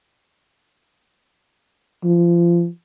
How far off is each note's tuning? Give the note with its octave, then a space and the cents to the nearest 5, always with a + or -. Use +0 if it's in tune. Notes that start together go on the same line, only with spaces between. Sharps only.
F3 -25